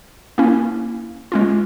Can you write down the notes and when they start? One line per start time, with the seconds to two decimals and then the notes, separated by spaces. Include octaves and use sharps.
0.38 A#3 C#4 E4
1.32 G#3 C#4 F4